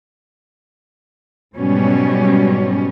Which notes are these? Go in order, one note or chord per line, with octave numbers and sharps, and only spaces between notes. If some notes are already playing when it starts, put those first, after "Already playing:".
G#2 B2 F#3 G3 C#4